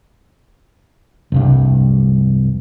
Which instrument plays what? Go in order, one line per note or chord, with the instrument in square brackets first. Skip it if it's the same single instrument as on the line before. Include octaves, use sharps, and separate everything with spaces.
[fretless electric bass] F1 C2 G2